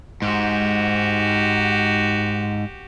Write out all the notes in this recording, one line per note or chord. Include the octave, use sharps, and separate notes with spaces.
G#2 F#4 G4